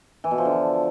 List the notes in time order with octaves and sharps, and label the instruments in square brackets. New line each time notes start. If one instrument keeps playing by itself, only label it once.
[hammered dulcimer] E3
B2
F3
D3